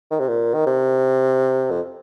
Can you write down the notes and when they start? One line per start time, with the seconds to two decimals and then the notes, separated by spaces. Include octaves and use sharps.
0.11 D#3
0.20 C3
0.29 A#2
0.54 D#3
0.67 C3
1.71 F2